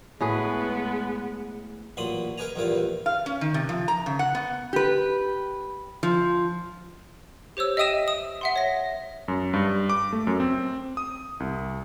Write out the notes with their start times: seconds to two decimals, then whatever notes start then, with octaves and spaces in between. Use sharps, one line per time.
0.20 A2 G#3 B3 G#4 B4
1.97 A1 A#2 F#3 B5 C6 D#6
2.38 G#4 A#4 B4 D#5 G#5 A#5
2.56 A#1 E2 G2 A#2 A#4 B4
3.06 F5
3.26 C#4
3.41 D#3
3.54 C3
3.69 F3
3.88 A#5
4.06 C#3
4.19 F#5
4.35 B3
4.73 G4 B4
6.03 F3
7.57 G4 C5 C#5 E6
7.77 D#5 E5 G5 D#6 D#7 E7
8.08 D#6
8.41 E5 F#5 C6
8.56 C#5 A#6
9.28 F#2
9.53 G2
9.89 D6
10.13 A3
10.27 F#2
10.40 C4
10.97 D#6
11.40 C2